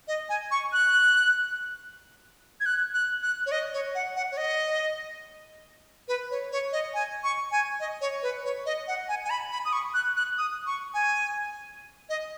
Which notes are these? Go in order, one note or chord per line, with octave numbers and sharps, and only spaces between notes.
D#5
G#5
C#6
F#6
G#6
F#6
F#6
F#6
C#5
D#5
C#5
F#5
F#5
C#5
D#5
B4
C#5
C#5
D#5
G#5
C#6
G#5
D#5
C#5
B4
C#5
D#5
F#5
G#5
G#5
B5
B5
D#6
C#6
F#6
F#6
D#6
C#6
G#5
D#5